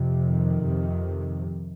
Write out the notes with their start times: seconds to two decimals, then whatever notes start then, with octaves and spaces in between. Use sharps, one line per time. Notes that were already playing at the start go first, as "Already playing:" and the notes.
Already playing: F2 C3
0.23 D#3
0.64 F2 C3